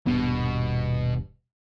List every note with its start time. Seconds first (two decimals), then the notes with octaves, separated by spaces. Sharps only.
0.07 D#1 G2 B2 B3